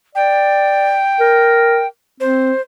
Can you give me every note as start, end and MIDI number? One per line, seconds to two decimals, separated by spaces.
0.15 0.99 74
0.15 1.86 79
1.20 1.85 70
2.20 2.52 60
2.20 2.61 72